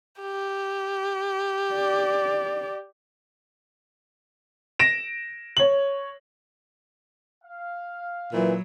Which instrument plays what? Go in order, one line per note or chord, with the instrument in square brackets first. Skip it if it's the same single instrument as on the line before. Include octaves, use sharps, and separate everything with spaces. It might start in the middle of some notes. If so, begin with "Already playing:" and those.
[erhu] G4
[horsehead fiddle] D5
[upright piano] A#6 D7 E7
C#5 F#7
[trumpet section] F5
[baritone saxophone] A#2 [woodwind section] E3 [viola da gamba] F#3 [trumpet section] B3 E4 E5